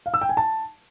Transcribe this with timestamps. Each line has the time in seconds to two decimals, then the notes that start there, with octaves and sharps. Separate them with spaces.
0.06 F5
0.14 E6
0.21 G5
0.29 G#5
0.37 A5